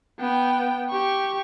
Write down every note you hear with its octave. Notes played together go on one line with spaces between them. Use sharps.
B3 G5
G4 C#6